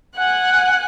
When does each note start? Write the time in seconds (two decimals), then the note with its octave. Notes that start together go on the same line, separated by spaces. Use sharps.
0.16 F#5 G#5 F#6